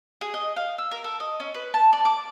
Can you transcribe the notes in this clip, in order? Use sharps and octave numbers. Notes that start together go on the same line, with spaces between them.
G#4
D#5
F5
E6
A#4
A4
D#5
C#4
B4
A5
D5
D6